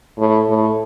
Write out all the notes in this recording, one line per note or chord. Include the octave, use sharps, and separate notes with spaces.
A2
A2